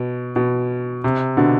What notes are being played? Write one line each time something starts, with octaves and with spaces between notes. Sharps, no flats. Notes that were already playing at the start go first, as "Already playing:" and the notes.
Already playing: B2
B2
C3
B2 D3